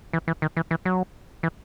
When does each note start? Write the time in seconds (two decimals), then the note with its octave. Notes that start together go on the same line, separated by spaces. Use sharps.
0.13 E3
0.28 E3
0.42 D#3
0.57 E3
0.71 E3
0.85 F#3
1.43 E3